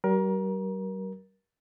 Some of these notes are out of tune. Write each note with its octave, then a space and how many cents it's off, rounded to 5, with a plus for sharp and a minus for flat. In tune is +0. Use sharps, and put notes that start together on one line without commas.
G3 -45 A#4 +25